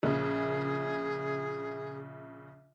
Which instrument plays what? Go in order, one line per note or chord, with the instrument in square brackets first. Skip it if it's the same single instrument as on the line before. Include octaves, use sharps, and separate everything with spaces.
[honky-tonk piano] A#1 C#3 [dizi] G#4